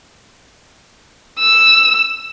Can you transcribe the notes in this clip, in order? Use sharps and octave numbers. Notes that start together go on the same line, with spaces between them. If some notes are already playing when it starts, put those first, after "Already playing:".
E6